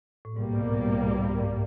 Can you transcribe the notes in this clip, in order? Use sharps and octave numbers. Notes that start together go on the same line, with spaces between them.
A2
C2 G#2 B2 G3 A#3
G#2
G2
G#2